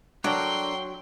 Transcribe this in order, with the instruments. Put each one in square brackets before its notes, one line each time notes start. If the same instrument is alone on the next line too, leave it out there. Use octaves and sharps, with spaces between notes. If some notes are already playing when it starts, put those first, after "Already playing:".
[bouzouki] F#3 [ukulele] D4 [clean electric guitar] A4 A#4 F#5 [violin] G5 C6